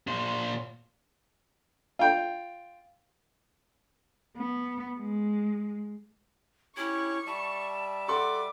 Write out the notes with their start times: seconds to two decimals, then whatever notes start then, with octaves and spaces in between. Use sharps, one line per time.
0.07 A#2 C5
1.99 F4 G5
4.38 B3
5.00 G#3
6.77 C#4 E4 G4 C#5 C#6
7.26 G3 D5 E5 A5
8.08 A4 F#5 C6 D6